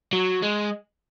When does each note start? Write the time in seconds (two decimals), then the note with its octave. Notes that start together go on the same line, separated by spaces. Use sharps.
0.13 F#3
0.42 G#3